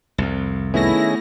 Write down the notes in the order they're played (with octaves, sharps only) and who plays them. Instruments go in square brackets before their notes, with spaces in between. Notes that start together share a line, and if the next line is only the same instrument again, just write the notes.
[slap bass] C2 F2
[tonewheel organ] D#3 C#4 G#4 [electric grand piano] A3 B3 [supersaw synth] E4 A#6